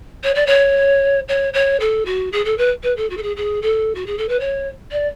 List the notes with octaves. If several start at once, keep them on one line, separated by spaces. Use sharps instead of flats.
C#5
D5
C#5
C#5
C#5
A4
F#4
G#4
A4
B4
B4
A4
F#4
A4
G#4
G#4
A4
F#4
G#4
A4
B4
C#5
D5